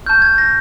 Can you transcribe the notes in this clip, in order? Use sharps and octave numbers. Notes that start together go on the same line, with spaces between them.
A5 C#6 F6 G6
G#6
A#6